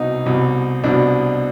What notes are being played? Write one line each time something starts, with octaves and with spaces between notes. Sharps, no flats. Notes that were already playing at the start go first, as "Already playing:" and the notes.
Already playing: C2 B2 D#4
C2 B2
C2 B2 D4